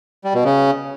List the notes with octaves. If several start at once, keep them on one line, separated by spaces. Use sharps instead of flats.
G3
B2
C#3